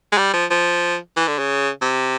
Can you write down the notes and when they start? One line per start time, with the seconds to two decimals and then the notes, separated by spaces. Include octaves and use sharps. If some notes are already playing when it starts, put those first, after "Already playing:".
0.12 G#3
0.18 G3
0.34 F3
0.50 F3
1.16 E3
1.28 D3
1.39 C#3
1.82 C3